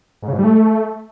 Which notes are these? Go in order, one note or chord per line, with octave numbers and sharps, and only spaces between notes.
G#2
C#3
G#2
G3
A3